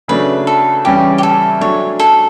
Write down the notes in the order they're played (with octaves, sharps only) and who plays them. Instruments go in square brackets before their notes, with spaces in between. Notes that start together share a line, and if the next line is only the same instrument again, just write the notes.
[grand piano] C#3 F#3 A3 D4 [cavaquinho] B4
[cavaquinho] A4
[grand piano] C#3 E3 G3 C#4 E4 [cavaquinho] G4
[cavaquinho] G4
A4
[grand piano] F#3 A3 D4 [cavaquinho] C#5
[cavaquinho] A4